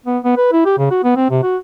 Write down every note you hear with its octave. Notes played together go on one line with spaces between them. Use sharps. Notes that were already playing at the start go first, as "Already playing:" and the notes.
B3
B3
B4
E4
G4
C#3
F#4
B3
C4
C3
F#4